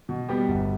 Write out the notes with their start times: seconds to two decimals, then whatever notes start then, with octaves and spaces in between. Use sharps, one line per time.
0.09 B2
0.29 G3 B3 G4
0.48 G1